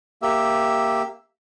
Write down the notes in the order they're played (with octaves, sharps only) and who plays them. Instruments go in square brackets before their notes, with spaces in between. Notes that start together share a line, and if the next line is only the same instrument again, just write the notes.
[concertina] A#3 G4 E5